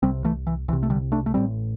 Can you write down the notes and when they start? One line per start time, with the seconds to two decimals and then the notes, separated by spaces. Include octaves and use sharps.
0.03 C2 C3 G3 C4
0.24 E3 A3
0.47 E3
0.68 C2 E3
0.73 C3
0.83 A3
0.90 D3 G3
1.12 A3 D4
1.26 A3
1.34 A1 A2 G3 C4